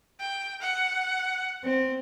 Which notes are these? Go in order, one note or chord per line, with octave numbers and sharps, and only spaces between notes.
G5
F#5
C4